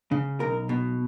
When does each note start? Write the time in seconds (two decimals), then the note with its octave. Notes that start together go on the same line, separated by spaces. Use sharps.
0.11 C#3
0.40 B1 A#4
0.69 B2